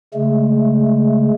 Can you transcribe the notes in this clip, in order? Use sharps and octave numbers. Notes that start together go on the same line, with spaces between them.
C#3 G#3 A3